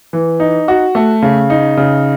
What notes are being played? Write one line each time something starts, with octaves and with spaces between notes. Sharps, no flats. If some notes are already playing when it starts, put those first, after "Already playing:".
E3
D#4
F#4
A3
C#3
D#4
C#3